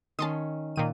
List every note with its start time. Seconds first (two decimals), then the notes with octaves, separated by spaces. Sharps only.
0.19 D#3 C#4 A5 C6 D#6
0.76 A#2 D#3 D#7